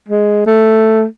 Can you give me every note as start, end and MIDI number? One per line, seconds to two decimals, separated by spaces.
0.08 0.44 56
0.46 1.05 57